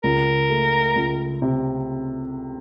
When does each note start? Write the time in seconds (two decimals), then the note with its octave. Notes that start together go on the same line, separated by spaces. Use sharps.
0.04 C#2 A#4
0.50 A3
0.96 C#2
1.42 C3